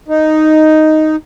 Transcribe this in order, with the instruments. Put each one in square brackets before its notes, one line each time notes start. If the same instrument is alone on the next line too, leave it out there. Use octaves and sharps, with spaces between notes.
[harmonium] D#4